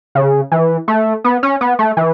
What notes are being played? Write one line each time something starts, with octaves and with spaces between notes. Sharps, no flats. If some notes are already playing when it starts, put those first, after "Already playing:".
C#3
E3
A3
B3
C#4
B3
A3
E3